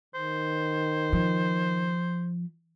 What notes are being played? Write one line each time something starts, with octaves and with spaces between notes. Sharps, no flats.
D#3 C5
F3